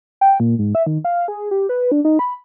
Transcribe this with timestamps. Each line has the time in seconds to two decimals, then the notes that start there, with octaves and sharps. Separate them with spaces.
0.21 G5
0.40 A#2
0.59 G#2
0.75 E5
0.86 D#3
1.05 F5
1.28 G#4
1.51 G4
1.69 B4
1.92 D4
2.05 D#4
2.19 B5